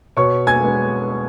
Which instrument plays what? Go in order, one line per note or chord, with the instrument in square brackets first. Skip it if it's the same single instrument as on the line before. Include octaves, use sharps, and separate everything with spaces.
[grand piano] B2 C#5 C#6
G#5 G#6
G#3 B3